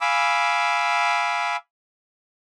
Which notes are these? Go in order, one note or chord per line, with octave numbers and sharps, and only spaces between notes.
F5 G#5 B5 D6 E6